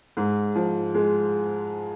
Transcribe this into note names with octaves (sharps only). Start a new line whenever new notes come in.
G#2
F3
G#3